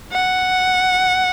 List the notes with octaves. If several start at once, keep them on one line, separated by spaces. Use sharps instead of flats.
F#5